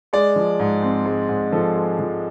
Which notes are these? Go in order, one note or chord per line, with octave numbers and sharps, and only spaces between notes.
G#3 D5
F3
G#2
C4
G#3
G#2
F3 A4
G#3
F3